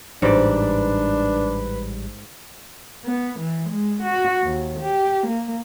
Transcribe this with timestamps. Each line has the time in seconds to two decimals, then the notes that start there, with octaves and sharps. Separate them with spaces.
0.22 A1 G#2 G3 D4 B4 D5
3.05 B3
3.39 E3
3.70 G#3
4.03 F#4
4.43 D#2
4.80 G4
5.27 A#3